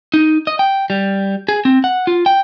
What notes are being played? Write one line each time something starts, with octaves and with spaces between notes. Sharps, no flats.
D#4
D#5
G5
G3
G#4
C4
F#5
F4
G5